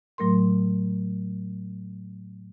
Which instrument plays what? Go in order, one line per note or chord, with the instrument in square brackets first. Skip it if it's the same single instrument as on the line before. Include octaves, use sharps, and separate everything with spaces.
[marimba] A2 F#3 A3 A#4 C6